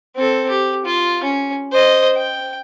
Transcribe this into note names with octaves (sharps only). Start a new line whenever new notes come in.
C4 A4
G4
F4
C#4
C5 D#5
G5